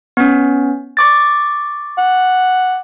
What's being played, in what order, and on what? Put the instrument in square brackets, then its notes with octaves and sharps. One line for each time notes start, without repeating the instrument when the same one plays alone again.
[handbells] B3 C#4
C#6 D6 A6
[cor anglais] F#5